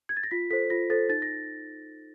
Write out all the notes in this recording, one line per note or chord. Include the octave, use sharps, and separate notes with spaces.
G#6
A6
A#6
F4 B6
A4 C5 B6
F4 A#6
A4 C5 A6
D#4 A6
A#6